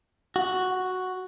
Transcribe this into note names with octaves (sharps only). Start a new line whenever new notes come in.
F#4